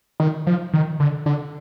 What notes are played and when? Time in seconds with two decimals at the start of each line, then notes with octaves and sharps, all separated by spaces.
0.20 D#3
0.47 F3
0.73 D#3
1.00 D3
1.26 D3